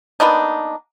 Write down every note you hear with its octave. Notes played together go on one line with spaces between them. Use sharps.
A#3 B3 D4 D#4